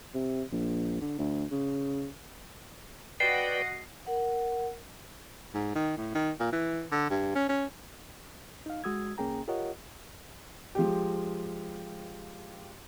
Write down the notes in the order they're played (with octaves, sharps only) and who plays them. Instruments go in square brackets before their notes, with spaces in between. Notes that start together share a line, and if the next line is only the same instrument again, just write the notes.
[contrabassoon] C3
A#1
D3
D2
C#3
[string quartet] F#4 D#5 F#5 [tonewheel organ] B4 D5 G5 [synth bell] C7
[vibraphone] A#4 F#5
[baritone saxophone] G#2
D#3
A2
D#3
A#2
E3
D3
G2
C#4
C#4
[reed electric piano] D#4 F5
G#3 F#4 D#6 E6 G#6
C2 A#3 C#4 G#4 G5 A#5
F4 G4 A#4 C#5 D#5 F#5
[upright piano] F3 G#3 G4